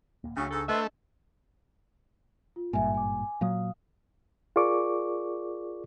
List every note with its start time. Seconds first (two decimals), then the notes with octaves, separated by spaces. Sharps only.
0.24 D#1 A#3
0.37 C#2 C#3 F#3 A3 D4 C#6 D#6
0.51 G#2 A4
0.69 A3 B4 C5 D#5 E5 E6
2.56 F4
2.73 G#1 G2 A#2 E5 G#5
2.95 G#5 D6
3.41 A#2 F#3 F5 D#6
4.56 F4 G#4 A#4 D5 C#6 D6